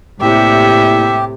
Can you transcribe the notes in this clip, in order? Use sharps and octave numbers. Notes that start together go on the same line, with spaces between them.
A2 C3 A#3 E4 G4 D5 E5